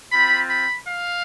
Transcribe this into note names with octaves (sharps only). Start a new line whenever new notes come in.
C4 F4 B5
B5
F5